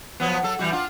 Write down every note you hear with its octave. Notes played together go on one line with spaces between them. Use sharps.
F3 F#3 B3
F#3 A4
E3 G3 F#4
D4 F4